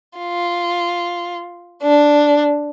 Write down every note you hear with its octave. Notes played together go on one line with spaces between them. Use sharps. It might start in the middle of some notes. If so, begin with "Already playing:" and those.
F4
D4